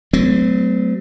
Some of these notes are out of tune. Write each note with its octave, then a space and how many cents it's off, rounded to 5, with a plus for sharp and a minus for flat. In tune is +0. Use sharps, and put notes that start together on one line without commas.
F#3 +30 A3 +0 C4 -40